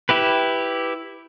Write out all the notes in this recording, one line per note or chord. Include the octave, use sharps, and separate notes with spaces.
E4 G4 B4